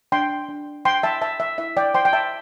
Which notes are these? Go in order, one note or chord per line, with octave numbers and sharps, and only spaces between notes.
D4 G5 C6
D4
C5 G5 C6
E5 A5
C5 E5 A5
E5
E4 E5
D5 G5
C5 G5 C6
G5
E5 A5